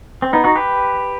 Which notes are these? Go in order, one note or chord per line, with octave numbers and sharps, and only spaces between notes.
C4
B3 D#4
D#4 F#4
G4 B4